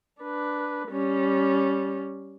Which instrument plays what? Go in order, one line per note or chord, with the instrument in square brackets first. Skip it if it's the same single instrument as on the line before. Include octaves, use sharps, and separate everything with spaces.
[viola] D4 B4
G3 C#4